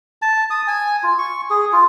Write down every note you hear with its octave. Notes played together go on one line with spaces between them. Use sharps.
A5
D#6
G#5
F4
C#6
G#4
F4